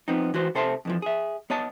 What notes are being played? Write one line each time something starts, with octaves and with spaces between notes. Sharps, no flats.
F3 B3 C4 D#4
E3 F#4 B4 C5
C3 A4 C5 E5 A5 C6
F2 E3 F3
G#4 E5
B3 C#5 D#5 A5